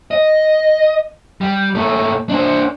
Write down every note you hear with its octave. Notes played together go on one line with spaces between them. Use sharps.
D#5
G3
A#2 A3
D4 C5